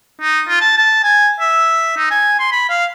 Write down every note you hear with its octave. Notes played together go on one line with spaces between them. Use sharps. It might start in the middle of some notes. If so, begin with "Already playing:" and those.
D#4
F4
A5
A5
G#5
E5
D#4
G#5
C6
B5
F5